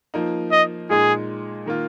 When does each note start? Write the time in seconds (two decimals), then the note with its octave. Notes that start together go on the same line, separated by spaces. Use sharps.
0.14 F3 A#3 D#4
0.52 D#5
0.90 A#2 G#3 D#4 G#4
1.66 D#3 A#3 F4